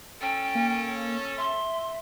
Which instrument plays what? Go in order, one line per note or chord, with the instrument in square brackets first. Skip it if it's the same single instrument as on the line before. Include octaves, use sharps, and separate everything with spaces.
[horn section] C#4 A4 [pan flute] G5
[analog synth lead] A#3
[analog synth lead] E5 [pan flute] C6